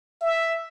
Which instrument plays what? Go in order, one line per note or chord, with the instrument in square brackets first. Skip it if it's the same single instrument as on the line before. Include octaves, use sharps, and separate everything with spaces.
[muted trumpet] E5